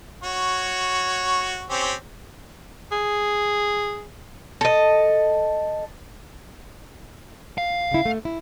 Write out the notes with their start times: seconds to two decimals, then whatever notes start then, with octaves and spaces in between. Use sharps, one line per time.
0.24 F#4 C#5
1.70 C4 C#4 G4
2.91 G#4
4.61 A4 D#5
7.58 F5
7.91 C#3 E4
8.06 A3
8.25 E4